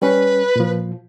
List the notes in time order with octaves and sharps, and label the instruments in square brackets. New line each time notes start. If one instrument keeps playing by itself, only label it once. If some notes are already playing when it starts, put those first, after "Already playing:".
[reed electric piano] G3 C#4 [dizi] B4
[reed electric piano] A#2 F3